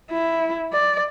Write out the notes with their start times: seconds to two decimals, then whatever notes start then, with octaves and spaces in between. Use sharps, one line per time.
0.11 E4
0.73 D5